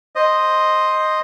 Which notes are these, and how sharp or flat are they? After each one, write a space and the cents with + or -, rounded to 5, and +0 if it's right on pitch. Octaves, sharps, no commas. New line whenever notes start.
C5 +0 D#5 +0